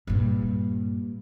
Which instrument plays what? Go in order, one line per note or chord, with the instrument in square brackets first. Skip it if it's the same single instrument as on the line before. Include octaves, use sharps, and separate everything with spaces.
[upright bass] G2 A#2